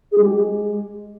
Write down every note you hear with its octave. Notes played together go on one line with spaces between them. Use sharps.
G#4
G#3
G4
G#3